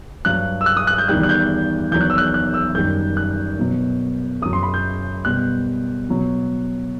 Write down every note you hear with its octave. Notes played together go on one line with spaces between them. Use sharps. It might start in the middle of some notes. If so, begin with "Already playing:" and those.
G2 F#3 F#6
E6
F#6
D#6
F#6
G6
E2 D#3 G3 F#6
F#6
G6
E2 D#3 F#3 G6
F#6
E6
F#6
F#6
E6
F#2 D#3 G3 G6
F#6
B2 F#3
F#2 F#3 D#6
C6
B5
G6
B2 G3 F#6
B2 F#3